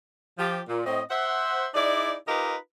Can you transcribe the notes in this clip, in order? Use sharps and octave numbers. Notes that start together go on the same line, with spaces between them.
F3 G4
A#2
A2 C4 C#5 D#5
C5 E5 F#5
D#4 E4 G#4 D5
D#4 F4 G4 A#4 B4 D#5